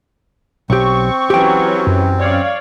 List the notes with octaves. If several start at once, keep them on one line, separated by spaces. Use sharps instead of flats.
B1 C4 G4 C#6
E3 F#3 C#4 G4 G5
F#2
C#5 D5 F5